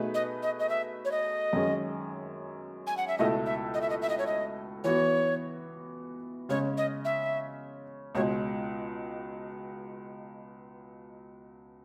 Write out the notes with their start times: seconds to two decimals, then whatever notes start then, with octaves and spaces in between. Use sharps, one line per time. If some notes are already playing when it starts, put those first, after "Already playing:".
Already playing: B2 A3 D#4 G#4 B4
0.14 D#5
0.42 D#5
0.59 D#5
0.69 E5
1.05 C#5
1.12 D#5
1.53 F#2 D#3 G#3 C#4 G#4
2.87 G#5
2.97 F#5
3.08 E5
3.18 C#2 B2 A3 E4 A4 D#5
3.46 E5
3.74 D#5
3.81 E5
3.90 D#5
4.02 E5
4.09 D#5
4.18 C#5
4.27 D#5
4.84 E3 B3 F#4 C#5
6.49 C#3 G#3 C#4 C#5
6.77 D#5
7.05 E5
8.15 C#2 B2 G#3 C#5